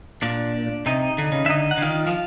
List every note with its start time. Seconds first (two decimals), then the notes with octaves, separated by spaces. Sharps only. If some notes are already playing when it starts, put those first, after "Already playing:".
0.22 A#2 D4 D5
0.86 C3 D#4 D#5
1.18 D3
1.32 C#3
1.45 D3 E5
1.49 D#4 D#5
1.71 F#5
1.78 D3
1.82 D#3 F4 F5
2.07 F3